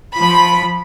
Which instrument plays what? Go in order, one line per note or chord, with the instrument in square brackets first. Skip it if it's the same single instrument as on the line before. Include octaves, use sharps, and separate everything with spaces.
[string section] F3 B5